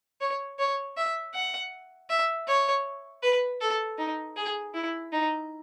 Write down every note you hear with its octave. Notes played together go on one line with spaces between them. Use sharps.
C#5
C#5
E5
F#5
E5
C#5
B4
A4
D#4
G#4
E4
D#4